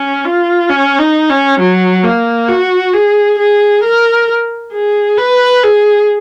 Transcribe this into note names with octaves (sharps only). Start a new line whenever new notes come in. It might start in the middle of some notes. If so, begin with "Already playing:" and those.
Already playing: C#4
F4
C#4
D#4
C#4
F#3
A#3
F#4
G#4
G#4
A#4
G#4
B4
G#4